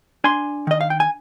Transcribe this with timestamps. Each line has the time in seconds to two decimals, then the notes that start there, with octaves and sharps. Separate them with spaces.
0.24 D4 G#5 C6
0.67 D#3 D#5
0.81 F5
0.90 G5
1.00 G#5